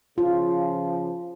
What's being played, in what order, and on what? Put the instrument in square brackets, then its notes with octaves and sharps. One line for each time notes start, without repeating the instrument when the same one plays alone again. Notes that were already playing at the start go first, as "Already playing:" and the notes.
[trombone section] C#3 F3 [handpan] F4